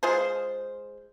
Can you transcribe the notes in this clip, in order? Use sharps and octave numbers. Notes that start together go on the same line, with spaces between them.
G#3 F4 G#4 C5